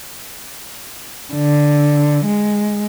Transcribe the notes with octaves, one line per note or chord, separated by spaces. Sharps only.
D3
G#3